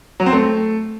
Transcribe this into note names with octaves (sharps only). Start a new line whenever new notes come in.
F#3
C4
A3